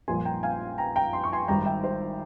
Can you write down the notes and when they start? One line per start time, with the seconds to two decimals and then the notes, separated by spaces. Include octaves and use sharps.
0.08 A#1 A#2 G3 A#3 G#5 C6
0.25 G5 A#5
0.43 F5 G#5
0.78 G5 A#5
0.96 G5 A#5
1.13 C6
1.24 C#6
1.33 G#5 C6
1.48 G#1 G#2 G3 G5 A#5
1.66 E5 G5
1.84 C5